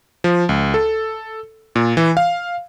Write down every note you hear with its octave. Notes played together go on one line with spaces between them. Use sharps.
F3
C#2
A4
A#2
E3
F5